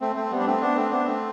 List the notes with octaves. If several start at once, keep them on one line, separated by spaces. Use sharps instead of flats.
A3 C4
A3 C4
G3 B3
D4
A3 C4
B3 D4
A3 C4
B3 D4
A3 C4